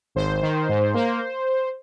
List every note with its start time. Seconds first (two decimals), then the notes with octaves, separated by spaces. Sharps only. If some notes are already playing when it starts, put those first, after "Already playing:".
0.15 G#1 C5
0.42 D#3
0.69 G#2
0.94 A#3